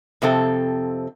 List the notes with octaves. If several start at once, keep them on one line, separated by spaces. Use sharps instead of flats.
F2 C3 C4 A4